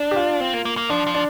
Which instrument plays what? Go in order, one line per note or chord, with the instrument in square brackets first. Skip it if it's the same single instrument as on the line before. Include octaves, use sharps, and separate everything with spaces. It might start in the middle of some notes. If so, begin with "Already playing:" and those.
Already playing: [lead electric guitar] D4
[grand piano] G4
F4
[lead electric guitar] C4
A#3
A#3
A#3
[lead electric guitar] F3 [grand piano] D4
[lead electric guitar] F3
[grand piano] D4